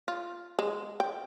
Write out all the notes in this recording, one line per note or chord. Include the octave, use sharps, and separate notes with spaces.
F4
G#3
G5